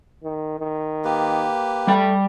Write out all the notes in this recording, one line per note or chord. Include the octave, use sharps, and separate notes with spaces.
D#3
D#3
A#3 G4 B4
G3 A3 G5